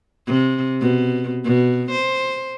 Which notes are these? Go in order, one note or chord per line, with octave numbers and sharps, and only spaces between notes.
C3
B2
B2
C5